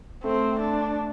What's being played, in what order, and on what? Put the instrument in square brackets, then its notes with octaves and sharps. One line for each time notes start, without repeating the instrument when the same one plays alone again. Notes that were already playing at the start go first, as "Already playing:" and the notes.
[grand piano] A3 [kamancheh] C4
[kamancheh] D4